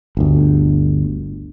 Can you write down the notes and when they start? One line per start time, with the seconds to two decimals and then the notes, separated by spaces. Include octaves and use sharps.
0.17 G1 D2